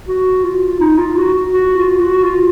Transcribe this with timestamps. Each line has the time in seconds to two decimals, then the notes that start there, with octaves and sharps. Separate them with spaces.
0.08 F#4
0.43 F4
0.80 D#4
0.98 F4
1.16 F#4
1.51 F#4
1.76 F4
1.99 F#4
2.23 F4